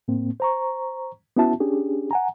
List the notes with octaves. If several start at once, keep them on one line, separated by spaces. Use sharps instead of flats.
A2 A#3 C4
C5 A#5 C#6
B3 C#4 E4 F#4 E5 A5
C#4 D4 G4 G#4
F#5 G#5 A#5